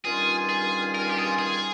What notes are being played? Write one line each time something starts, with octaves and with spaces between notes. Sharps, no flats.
G2 D#3 G3 C#4 F4 G#4
G#4
A#4
G#4
G4
G#4
G#4